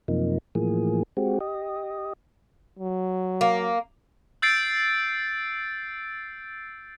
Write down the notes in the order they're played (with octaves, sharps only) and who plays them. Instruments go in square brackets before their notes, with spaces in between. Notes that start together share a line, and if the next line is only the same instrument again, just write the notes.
[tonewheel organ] F#2 C3 F3 A#3 D#4
A2 E3 F3 A#3 G#4
G#3 C4 F#4 G4
G4 D#5
[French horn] F#3
[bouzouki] A#3
[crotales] E6 G6 A6 C7 D7